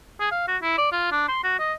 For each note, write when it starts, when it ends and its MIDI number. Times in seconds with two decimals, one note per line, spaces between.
0.20 0.28 68
0.31 0.44 77
0.48 0.57 66
0.62 0.74 64
0.78 0.87 74
0.92 1.07 65
1.12 1.25 62
1.28 1.40 84
1.43 1.59 66
1.59 1.73 75